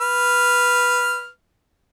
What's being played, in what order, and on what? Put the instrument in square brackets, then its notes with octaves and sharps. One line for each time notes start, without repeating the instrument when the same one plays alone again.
[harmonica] B4 F6